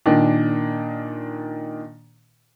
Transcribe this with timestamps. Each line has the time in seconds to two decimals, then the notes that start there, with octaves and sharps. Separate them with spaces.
0.06 A#2 D#3 D4